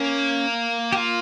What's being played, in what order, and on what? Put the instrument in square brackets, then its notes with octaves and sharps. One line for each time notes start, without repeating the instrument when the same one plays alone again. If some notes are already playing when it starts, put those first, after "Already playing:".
Already playing: [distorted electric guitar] A#3 [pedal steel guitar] C#4
[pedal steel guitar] G4
F4